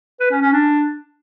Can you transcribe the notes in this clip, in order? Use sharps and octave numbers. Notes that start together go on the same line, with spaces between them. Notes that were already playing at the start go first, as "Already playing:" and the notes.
B4
C#4
C#4
D4